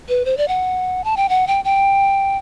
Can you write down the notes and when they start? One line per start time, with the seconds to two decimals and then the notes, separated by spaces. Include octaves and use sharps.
0.09 B4
0.25 C5
0.37 D5
0.48 F#5
1.04 A5
1.17 G5
1.29 F#5
1.47 G5
1.65 G5